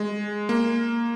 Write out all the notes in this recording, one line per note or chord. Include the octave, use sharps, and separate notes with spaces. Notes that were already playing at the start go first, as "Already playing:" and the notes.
Already playing: G#3
A#3